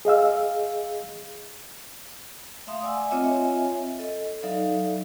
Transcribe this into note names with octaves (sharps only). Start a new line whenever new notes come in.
G#4 D#5 F5 E6
A3 E5 F5 C6 D#6
D5 E5 F#5 G#5 D6 E6
C4 F4 C#5 D#5 E5 G#5
A4 D#5
F#3 D#4 A4 D5 E5 F5